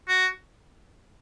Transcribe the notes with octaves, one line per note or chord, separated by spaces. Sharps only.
F#4